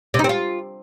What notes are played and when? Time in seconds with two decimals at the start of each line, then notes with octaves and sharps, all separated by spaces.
0.14 C3
0.19 D#4
0.24 C4
0.29 F4